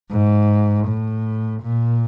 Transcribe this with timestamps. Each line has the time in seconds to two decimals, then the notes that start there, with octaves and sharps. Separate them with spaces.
0.12 G#2
0.88 A2
1.63 A#2